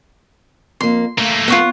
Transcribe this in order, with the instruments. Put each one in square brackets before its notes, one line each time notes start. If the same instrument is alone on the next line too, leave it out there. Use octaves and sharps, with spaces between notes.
[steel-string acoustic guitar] F2 A#3 [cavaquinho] C6
[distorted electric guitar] A3 A#3 [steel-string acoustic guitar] F5
[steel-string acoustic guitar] B3 [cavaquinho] F4 C#5 F#5